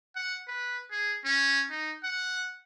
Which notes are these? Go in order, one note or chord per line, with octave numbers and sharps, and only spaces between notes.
F#5
B4
G#4
C#4
D#4
F#5